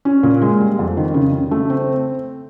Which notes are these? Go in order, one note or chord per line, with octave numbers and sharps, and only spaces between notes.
C#4
A#2
G#3
G3
F2
D#3
C#3
C#3
A3
C4